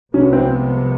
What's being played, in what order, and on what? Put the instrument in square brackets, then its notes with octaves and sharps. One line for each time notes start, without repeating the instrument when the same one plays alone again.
[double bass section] C2 C3 F3 G#3 B3 [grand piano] C#4
[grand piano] C4